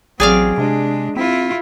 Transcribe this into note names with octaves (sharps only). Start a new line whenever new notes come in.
A1 F#3 C4 G#4 D5 F5
C3 G#3 D4
C4 E4 F4